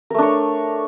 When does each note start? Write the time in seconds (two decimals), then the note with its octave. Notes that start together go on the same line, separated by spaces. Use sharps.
0.10 A#4
0.14 A3
0.18 D4
0.22 C#5